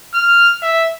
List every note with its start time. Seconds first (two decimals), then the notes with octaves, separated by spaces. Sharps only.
0.14 F6
0.62 E5